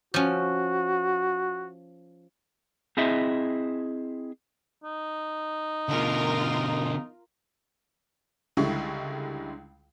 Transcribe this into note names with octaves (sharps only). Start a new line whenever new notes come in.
F3 C#4 F#4
C4 E4 G#4 D#5 E5
D#4
B2 D3 F4 A#4
C#2 D3 G3 G#3 E4 C#6